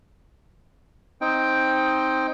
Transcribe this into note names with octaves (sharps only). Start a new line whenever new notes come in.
C4 D#4 G5